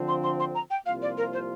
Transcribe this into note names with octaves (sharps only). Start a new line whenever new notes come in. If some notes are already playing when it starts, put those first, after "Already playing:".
Already playing: D3 F3 C4
C6
C6
C6
A#5
G5
C2 C3 F3 A#3 F4 F5
D5
A#4
C5